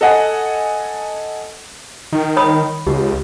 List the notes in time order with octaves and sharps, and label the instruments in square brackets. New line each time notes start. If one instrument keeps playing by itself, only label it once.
[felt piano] A4 D#5 F#5 G#5
[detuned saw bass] D#3
[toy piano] C#5 B5 D#6
[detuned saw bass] C#2 [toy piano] G4